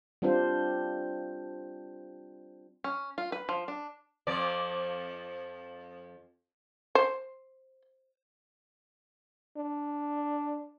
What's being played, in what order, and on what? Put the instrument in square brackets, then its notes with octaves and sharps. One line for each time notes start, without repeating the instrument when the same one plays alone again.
[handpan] G3 C4 D4 F4 C5
[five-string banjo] C#4
F4
B4
F3
D4
[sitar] F2 F3 D5
[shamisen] C5
[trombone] D4